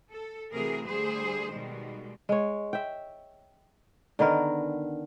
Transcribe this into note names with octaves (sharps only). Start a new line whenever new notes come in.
A4
C3 E3 A3 F#4 G#4 A#4
D3 G3 A3 G#4 C5
B2 D#3 G3 G#3
G#3 C#5
E5 G5
D3 D#3 B3 A#4